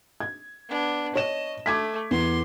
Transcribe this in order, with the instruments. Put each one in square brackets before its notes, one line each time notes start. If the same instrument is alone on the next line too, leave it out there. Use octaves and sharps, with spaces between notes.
[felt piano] G#6
[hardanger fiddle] B3 D4
[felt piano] C#5 E7 [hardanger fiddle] D#5
[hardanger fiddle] A3 [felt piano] D6 G#6 B6
[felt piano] E2 [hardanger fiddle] C6